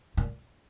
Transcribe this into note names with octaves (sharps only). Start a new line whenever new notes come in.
A#2